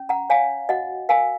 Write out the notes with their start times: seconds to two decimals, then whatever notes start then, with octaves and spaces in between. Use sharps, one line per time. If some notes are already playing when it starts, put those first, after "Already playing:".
Already playing: C#4
0.09 F#5 A#5
0.30 C#5 F5 G#5
0.69 F#4 D#5 F#5
1.09 A#4 F5 G#5